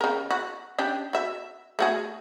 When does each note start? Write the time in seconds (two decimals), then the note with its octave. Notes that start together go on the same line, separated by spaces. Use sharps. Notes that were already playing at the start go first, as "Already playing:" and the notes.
0.01 C#3 A#4
0.31 F#4
0.79 C#4 D4 G4
1.13 F#4 E5
1.79 A3 F#4 G#4